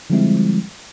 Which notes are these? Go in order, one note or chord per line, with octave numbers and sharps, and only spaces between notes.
D3 F3 G3 G#3 C4 E4